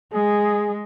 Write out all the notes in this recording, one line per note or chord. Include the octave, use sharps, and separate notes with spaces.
G#3 G#4